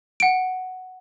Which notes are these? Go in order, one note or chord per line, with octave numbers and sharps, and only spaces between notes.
F#5 D7